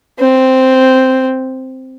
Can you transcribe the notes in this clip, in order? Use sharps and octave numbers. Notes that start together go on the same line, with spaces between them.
C4